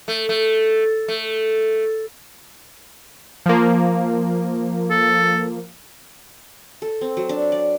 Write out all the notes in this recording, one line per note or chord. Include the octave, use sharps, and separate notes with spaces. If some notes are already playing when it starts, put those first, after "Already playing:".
A3
A3
A3
F3 A#3
A4
A4
C4
F#3
D4
D5